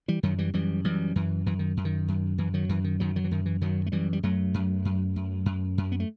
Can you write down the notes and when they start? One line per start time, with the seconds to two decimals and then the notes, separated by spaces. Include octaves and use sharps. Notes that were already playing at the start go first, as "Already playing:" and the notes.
0.08 E3 G3
0.23 F#2 D#3 F#3
0.38 E3 G3
0.54 F#2 E3 G3
0.84 F#2 E3 G3
1.16 F#2 E3
1.46 F#2 E3
1.59 D#3
1.77 F#2
1.85 D#3
2.08 F#2
2.38 F#2 E3
2.54 D#3 F#3
2.69 F#2 E3
2.84 D#3
3.00 F#2 D#3 F#3
3.16 D#3 F#3
3.24 E3
3.31 F#2 D#3
3.46 E3
3.61 F#2 D#3 F#3
3.86 A3
3.92 F#2 E3 G3
4.13 G3
4.23 F#2 F#3 A3
4.54 F#2
4.85 F#2
5.16 F#2
5.46 F#2
5.78 F#2
5.92 B3
6.00 A3